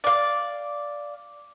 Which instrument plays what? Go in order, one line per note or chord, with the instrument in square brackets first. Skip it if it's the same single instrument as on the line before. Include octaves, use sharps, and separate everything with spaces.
[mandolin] D5 F5